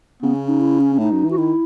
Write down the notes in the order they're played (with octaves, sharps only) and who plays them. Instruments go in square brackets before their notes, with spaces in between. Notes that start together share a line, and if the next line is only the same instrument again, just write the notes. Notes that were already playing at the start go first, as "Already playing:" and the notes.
[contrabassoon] C#3 [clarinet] B3
[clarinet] C#4
D#4
E4
C#4
C#4
[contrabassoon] A2 [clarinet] D#4
[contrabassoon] F#2
E3
[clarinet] F#4
[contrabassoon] D#3 [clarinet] E4